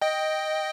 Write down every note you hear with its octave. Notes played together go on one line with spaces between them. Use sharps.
D#5 G5